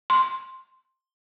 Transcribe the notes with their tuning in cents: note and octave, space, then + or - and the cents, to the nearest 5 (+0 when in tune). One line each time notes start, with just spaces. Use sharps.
C6 +5